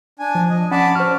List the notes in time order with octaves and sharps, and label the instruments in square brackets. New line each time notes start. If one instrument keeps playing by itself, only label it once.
[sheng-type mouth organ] D4 G#5
[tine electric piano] F3
[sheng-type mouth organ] D#5
[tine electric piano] C#4 F#5 [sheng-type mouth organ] D5 A5 B5
[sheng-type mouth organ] F#4 [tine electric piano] C5 F6